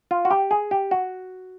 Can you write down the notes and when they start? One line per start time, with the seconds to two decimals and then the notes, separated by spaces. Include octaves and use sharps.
0.11 F4
0.25 F#4
0.31 G4
0.51 G#4
0.71 G4
0.91 F#4